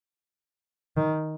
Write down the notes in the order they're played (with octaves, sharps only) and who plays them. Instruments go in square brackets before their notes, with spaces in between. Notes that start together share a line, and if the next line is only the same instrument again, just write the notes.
[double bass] D#3